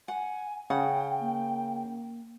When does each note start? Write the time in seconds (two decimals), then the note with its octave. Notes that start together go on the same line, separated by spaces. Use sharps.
0.08 F#5 G#5
0.70 C#3 F#5 G5
1.20 A#3